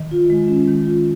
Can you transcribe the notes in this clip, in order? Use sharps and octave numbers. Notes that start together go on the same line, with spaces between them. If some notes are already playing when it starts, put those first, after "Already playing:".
Already playing: D#3
F4
G#3
C#4
D#3
F4